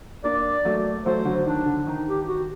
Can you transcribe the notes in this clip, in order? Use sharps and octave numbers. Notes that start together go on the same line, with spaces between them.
A#3 D4 D5
F#3 A3
F#3 A3 C5
D3 F#3
D#3 D4
D3
D#3 D#4
G4
F#4